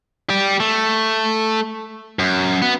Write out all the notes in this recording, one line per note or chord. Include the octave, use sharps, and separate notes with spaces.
G4 D5
A3
F#2
B3